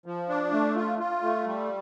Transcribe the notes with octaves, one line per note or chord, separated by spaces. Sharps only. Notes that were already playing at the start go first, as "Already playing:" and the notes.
F3
D4
A3
F4
F4
A3
G3